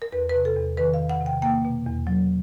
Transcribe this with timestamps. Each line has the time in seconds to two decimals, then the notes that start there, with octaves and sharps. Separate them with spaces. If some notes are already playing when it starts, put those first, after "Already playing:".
0.02 A#4
0.12 E2 B4
0.29 C3 B4
0.45 A4
0.56 E2
0.77 D#3 B4
0.94 F5
0.99 E2
1.10 F#5
1.21 C3
1.26 G5
1.42 A#3 G5
1.65 B2
1.86 E2
2.07 F#3